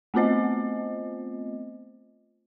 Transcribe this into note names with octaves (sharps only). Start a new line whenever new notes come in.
A3 B3 C4 F4 C5 D#5